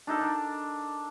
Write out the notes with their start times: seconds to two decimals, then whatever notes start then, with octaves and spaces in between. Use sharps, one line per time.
0.07 D4 D#4 A4 A#4
0.21 D4